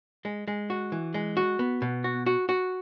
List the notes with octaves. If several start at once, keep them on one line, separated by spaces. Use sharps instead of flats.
G#3
G#3
F#4
E3
G#3
F#4
B3
B2
F#4
F#4
F#4